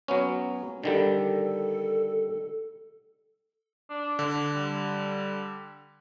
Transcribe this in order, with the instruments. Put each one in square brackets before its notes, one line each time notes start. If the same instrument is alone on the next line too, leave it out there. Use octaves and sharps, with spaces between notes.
[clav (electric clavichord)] F#3 B3 C#4
[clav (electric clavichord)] D3 D#3 G3 [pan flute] A4
[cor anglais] D4
[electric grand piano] D3
[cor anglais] G3